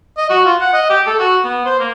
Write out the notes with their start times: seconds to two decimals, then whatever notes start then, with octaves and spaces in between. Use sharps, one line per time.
0.17 D#5
0.30 F#4
0.45 F4
0.60 F#5
0.73 D#5
0.90 G4
1.07 A4
1.19 F#4
1.44 B3
1.65 C5
1.80 A#3